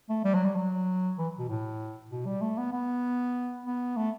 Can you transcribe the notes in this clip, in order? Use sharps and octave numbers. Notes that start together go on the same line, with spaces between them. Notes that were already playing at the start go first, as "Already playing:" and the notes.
A3
G3
F#3
G3
F#3
E3
B2
A2
B2
G3
A3
B3
B3
B3
A3